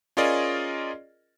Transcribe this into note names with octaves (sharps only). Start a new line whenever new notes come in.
C#4 F4 G#4 A#4 D5 D#5